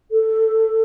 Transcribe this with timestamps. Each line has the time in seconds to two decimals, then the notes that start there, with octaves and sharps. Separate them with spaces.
0.11 A4